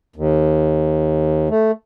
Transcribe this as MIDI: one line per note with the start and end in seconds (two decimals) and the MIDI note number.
0.16 1.49 39
1.49 1.71 57